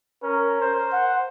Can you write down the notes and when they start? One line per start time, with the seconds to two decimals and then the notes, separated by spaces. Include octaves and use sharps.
0.23 C#4 A#4
0.60 C5
0.92 F#5